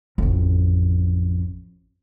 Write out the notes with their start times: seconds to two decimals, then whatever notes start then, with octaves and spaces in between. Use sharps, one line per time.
0.18 A1 F2